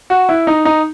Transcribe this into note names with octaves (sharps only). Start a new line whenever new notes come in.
F#4
E4
D#4
D#4